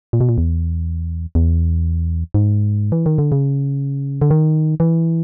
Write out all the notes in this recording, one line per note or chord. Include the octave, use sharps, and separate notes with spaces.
A#2
B2
A#2
E2
E2
G#2
E3
D#3
D3
C#3
D3
D#3
E3